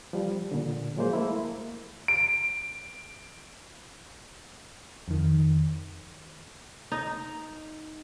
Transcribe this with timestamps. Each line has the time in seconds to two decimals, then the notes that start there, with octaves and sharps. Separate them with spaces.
0.13 F3 G3
0.52 A#2 D3
0.97 F3 F#3 G#3 A#3 C5
1.13 A3 A#3 E4
2.08 D7
5.08 F2 D#3
6.92 D#4